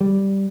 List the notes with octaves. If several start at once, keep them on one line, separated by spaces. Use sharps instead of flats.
G3